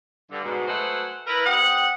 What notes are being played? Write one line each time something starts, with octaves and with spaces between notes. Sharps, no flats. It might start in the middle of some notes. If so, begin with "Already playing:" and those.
G2 D3
G#2 B2
F#3 A3 G#4 B4 C5 F#5
E4 A#4 B4
C4 G4 D#5 F#5